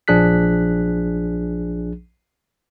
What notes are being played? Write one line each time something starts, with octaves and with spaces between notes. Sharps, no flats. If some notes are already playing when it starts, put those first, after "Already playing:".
A#1 F3 D4 G#4 F#6 B6